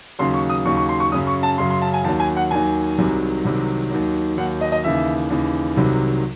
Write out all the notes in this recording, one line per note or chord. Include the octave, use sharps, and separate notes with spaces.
D#2 C#3 F#3 C6
C#6
D#6
D#2 C#3 F#3 C#6
C#6
C6
C#6
F#2 C#3 F#3 D#6
C#6
A5
F#2 C#3 F#3 C6
C6
A5
G#5
D#2 D#3 F#3 A5
G#5
F#5
D#2 D#3 F#3 G#5
C2 C3 D#3 F#3
C2 C3 D#3 F#3
D#2 D#3 F#3
D#2 D#3 F#3 F#5
D#5
D#5
D#2 C#3 E3 E5
D#2 C#3 E3
C2 C3 D#3 F#3